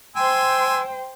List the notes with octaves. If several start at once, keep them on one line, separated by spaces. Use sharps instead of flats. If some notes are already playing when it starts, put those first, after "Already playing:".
C5 G5 G#5 C6 E6